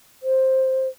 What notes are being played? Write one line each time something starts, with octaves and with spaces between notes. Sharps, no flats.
C5